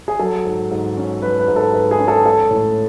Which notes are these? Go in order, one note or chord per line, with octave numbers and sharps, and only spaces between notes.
G#4
F#3 A4
G#2
G#2
C#4
F#3 B4
B4
G#2
A4
G#2 B4
G#4
C#4
A4
G#3 A4
A2